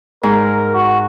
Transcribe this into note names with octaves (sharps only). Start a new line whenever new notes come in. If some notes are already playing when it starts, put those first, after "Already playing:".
G#2 A#4
F#4